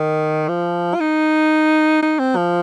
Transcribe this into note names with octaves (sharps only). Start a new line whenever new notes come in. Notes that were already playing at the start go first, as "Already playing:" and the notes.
Already playing: D#3
F3
F4
D#4
D#4
C4
F3